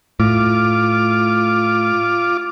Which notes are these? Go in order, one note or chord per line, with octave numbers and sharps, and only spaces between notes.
A2 F4 D6